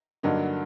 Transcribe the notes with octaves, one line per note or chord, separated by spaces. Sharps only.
G2 D3 F#3 A#3 D#4